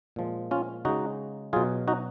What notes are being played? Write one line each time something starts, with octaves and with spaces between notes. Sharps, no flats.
A#2 F3 G#3
C#4 F4
C#3 G#3 D#4 F#4
B2 F#3 F4 G#4
D#4 F#4